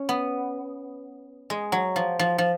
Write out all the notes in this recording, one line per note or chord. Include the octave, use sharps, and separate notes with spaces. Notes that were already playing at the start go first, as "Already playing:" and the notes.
Already playing: C#4
B3
G#3
F#3
F3
F3
F3